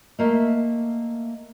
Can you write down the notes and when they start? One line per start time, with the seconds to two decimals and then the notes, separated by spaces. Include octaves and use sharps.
0.19 A3 A#3 D#5 E5